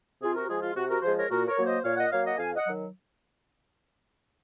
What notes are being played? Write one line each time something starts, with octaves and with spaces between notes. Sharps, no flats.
C3 F4 G#4
F#4 A#4
F3 G#3 F4 G#4
F4
C3 F#4
F#4 A#4
F3 G#3 G#4 C5
A#4 C#5
A#2 F#4 A#4
A#4 C#5
F#3 A#3
C5 D#5
A#2 C#5 F5
D#5 F#5
F#3 A#3 C#5 F5
D#5 F#5
F2 F5 G#5
D#5 F#5
D#3 F#3